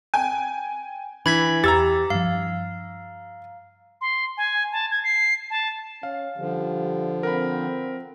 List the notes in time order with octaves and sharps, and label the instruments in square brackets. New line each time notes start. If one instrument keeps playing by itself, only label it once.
[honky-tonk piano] G5 G#5
[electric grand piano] E3 [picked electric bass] D4 [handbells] B5 G#6 B6
[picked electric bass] E2 [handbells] G4 [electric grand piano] A#5 E6 A6
[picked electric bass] G2 F3 [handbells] F5
[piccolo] C6
G#5
A5
G#6
C7
A5
[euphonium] C#4 [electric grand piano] F5
[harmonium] D3 F3 [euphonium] G3
[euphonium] C4 [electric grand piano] A#4 F#5 B5